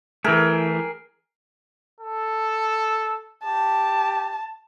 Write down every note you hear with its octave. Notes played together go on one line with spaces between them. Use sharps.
E3 A3 G#4 A#4 G5
A4
G4 A5